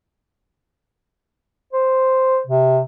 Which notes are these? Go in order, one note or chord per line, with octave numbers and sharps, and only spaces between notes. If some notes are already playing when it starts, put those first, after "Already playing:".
C5
C3